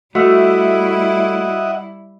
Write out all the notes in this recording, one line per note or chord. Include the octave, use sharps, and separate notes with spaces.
G3 A3 E4 F#4 D#5 E5 F#5 E6